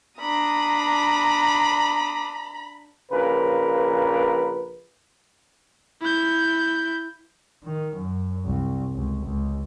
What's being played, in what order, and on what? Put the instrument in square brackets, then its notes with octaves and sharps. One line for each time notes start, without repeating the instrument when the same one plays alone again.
[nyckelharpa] D4 D#6 [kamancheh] A#5 B5
[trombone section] A#1 C#3 A#4 B4
[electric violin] E4 G6
[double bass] D#3
F#2
C2
C#2
C#2